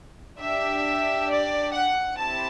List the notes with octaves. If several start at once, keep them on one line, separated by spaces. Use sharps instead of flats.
D4 G4 E5
D5
F#5
C4 E4 G4 A5